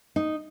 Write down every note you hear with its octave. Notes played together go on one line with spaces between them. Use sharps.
D#4